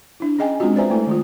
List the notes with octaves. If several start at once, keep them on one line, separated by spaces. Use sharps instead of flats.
D4 E4
C#4 G#4 D#5 G5 G#5
G#3 C4 D4 F4 F#4
B4 C5 D5 E5 G#5 A#5
A3 E4 A4
D#3 D#4 F4